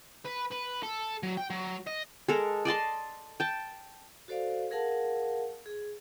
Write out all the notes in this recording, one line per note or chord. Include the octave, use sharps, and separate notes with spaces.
B4
B4
A4
F#3
G5
F#3
D#5
G#3 A4 A#4
D5 D#5 A5 C6
G5 A5
F#4 A4 C5 D5 F5
G#4 A#4 F5 F#5 A5
G#4